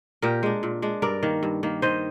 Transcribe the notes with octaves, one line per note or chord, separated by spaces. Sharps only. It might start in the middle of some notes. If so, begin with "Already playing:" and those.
A#2 G4 A#4
G#3 D4
A#2
G#3 D4
G2 A#4 D5
D#3 A#3
G2
D#3 A#3
D#3 C5 D#5